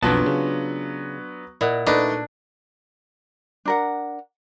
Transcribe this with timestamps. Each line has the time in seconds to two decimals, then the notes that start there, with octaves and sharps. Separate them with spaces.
0.03 B1 F2 F#3 B3 D4 F4 A5
0.26 C#3
1.61 A#2 E4 D#5 F#5
1.86 A3 D4 D#4 B4
3.65 D4 A#4 F#5